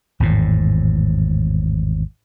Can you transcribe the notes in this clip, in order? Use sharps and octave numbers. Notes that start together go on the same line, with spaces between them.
G#1 E2 A2